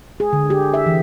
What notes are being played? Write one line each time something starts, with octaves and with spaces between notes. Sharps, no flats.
G#4
D3
G4
E5
E3